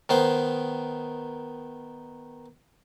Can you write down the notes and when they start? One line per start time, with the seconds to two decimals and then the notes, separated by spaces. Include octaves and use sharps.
0.09 D#3 B3 C5